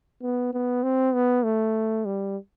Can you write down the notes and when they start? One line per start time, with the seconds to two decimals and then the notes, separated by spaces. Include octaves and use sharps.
0.22 B3
0.53 B3
0.83 C4
1.14 B3
1.44 A3
2.05 G3